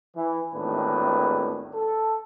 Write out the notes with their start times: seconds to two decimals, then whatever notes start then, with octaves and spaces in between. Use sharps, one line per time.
0.16 E3
0.54 G#1 E2 A2 D#3 D4 B4
1.75 A4